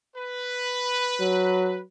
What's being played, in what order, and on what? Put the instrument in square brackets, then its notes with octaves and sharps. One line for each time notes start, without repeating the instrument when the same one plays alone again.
[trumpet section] B4
[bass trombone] F#3